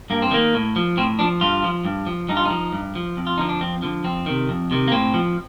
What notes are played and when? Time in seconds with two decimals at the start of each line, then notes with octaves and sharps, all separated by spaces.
0.10 G2 A#3
0.22 C4
0.31 D#3 A#3
0.54 A2
0.76 F3
0.97 A2 C4
1.19 F3 D4
1.41 G2 F4
1.64 F3
1.85 G2
2.07 F3
2.29 G2 D#4
2.37 F4
2.45 D#4
2.50 F3
2.73 G2
2.95 F3
3.17 F2
3.27 F4
3.38 D3 F3 D#4
3.49 D4
3.61 F2 C4
3.82 D3 F3
4.04 F2 C4
4.26 C3 D#3
4.49 F2
4.71 C3 D#3
4.88 A#3
4.92 A2 C4
5.14 F3